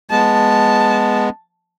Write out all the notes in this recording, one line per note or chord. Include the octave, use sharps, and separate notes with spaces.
G#3 B3 A5